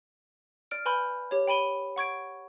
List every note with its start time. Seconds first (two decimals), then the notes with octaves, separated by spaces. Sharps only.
0.71 D5 F6 D7
0.85 B4 G#5 B5 C6 F6 G6
1.31 G4 C#5
1.47 G5 B5 D#7 G7
1.96 F#5 C#6 G#6 D7